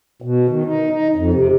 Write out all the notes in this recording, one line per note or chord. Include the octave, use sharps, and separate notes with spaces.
B2
D#3
D#4
D#4
F2
C3